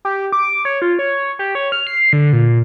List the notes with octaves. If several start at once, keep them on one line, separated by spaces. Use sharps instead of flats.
G4
D6
C#5
F4
C#5
G4
C#5
F6
C7
D3
A#2